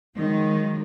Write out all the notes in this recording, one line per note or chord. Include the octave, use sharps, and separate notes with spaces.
D#3 F3 F#3 G#3